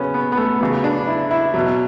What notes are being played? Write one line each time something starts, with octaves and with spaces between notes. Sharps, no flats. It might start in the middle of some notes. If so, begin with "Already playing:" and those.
Already playing: C#3 F#3 B3 C#4
B3
B3
A3
C#3 F#3 B3
D4
E4
E4
B2 F#3